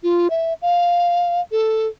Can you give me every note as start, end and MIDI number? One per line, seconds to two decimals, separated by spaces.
0.03 0.28 65
0.30 0.54 76
0.62 1.41 77
1.52 1.87 69